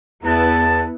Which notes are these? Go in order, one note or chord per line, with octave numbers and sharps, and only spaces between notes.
E2 B3 E4 A5